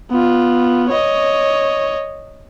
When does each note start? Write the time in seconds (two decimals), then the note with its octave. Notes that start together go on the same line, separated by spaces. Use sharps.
0.11 B3 F4
0.89 C#5 D#5